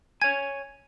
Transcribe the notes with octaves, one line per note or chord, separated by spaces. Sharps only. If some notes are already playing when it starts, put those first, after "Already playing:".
C#5 G#5 G#6